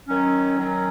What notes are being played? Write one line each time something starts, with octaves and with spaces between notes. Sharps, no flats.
D#3 F#3 C#4
D#3 F#3 C#4